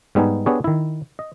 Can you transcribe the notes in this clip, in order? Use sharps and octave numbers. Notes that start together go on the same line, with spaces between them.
G#2 G3 B3 D#4 G#5
B3 D4 G4 G#4 C#5
D#3 E4
D#5